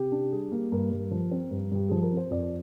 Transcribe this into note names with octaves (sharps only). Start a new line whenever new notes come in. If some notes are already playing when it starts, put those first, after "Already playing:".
Already playing: C3 G4
D4
G3 G#4
A#3
G2 A#4
G2
F3
C4
G2
G2 G4
F3 G#4
A#4
C4
C5
F2 D5